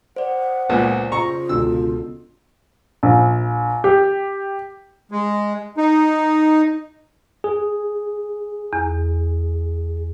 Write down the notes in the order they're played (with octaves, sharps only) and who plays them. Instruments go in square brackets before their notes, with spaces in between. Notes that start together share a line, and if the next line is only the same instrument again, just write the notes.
[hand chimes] C5 D5 [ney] F#5
[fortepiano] C#2 A#2 B3
[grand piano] C#3 [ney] F4 [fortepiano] A#5 C#6
[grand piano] C#2 B2 D3 [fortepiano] E6
[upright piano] A#1
G4
[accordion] G#3
D#4
[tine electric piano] G#4
[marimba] E2